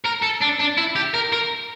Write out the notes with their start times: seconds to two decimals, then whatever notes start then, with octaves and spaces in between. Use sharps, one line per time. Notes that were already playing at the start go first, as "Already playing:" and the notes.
0.05 A#4
0.23 A4
0.42 D4
0.60 D4
0.78 E4
0.96 G4
1.14 A#4
1.33 A#4